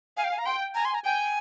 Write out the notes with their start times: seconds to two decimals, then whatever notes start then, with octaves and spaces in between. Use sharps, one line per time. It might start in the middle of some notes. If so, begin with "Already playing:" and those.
0.17 F5 G#5
0.24 G5
0.31 G#5
0.39 A#5
0.46 G5 C6
0.75 G#5 A#5
0.85 C6
0.94 A#5
1.05 G5 G#5